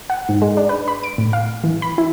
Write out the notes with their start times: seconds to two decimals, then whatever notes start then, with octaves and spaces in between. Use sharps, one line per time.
0.10 F#5
0.29 G#2
0.42 G#3
0.57 D4
0.69 B4
0.88 B5
1.03 D7
1.18 A2
1.33 F5
1.64 E3
1.82 B5
1.98 E4